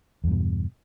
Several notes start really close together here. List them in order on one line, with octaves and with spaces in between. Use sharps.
E2 G2 B2